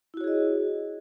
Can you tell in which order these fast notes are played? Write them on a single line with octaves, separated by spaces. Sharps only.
E4 F#4 C#5 G#4 D#5